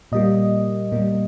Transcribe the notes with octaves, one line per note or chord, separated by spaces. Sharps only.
A#2 G3 A#3 D#5
A#2 G3 A#3